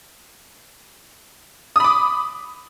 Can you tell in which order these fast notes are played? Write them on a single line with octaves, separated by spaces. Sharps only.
D#6 B5 D6